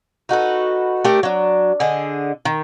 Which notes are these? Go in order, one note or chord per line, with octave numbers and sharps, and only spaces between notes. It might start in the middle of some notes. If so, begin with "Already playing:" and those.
D#4 F#4 A4 B4
A3 D4 G4 A#4
F#3 D4
D3 G#4 D#5
D#3